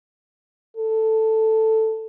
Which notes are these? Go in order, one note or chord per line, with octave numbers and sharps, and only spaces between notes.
A4